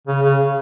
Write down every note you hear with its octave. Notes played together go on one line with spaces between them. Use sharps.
C#3
C#3